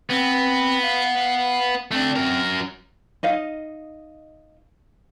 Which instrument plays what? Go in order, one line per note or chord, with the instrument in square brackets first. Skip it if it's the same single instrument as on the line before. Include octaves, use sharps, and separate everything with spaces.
[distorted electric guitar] B3 [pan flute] C4
[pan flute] F5
F5
[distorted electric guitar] A3 D4 [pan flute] C4
[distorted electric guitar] F#2 A#4
[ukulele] D#4 D#5 F5